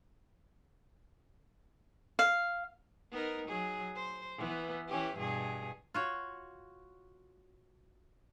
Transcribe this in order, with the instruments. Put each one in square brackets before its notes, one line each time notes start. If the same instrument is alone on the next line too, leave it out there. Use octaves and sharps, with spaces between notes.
[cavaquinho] F5
[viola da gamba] B3 D#4 A#4
F#3 G#4
C5
E3 B3
E3 C#4 G4
G2 B2 G#4
[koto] F4 F#4 C#5